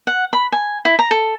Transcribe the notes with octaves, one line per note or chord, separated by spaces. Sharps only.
F#5
B5
G#5
E4
A#5
A4